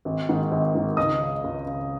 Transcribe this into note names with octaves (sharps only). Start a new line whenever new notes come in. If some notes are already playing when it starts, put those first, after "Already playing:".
G#1
G#2 D#3
G#1
G#2 D#3
C#2 D#5 D#6
C#3
C#2
C#3